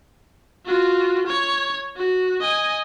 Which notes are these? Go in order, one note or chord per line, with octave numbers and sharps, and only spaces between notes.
F4 F#4
C#5
F#4
D#5 G#5